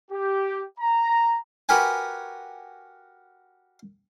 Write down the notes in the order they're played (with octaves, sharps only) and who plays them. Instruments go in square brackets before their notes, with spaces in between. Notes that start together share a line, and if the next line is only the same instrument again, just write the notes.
[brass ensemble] G4
A#5
[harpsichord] F#4 G4 A#4 B4 G5 G#5